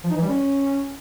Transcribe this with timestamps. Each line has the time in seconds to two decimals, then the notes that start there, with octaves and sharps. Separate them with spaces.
0.04 F3
0.10 D#4
0.16 E3
0.22 G3
0.29 C#4